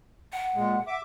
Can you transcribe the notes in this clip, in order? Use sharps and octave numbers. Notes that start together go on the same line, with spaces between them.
F#5
A#2 G#3
E5 D6